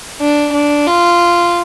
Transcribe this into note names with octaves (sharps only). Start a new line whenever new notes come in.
D4
D4
F4